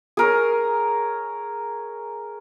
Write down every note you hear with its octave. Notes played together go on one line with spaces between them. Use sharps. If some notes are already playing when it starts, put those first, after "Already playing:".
G#4 A#4 C#5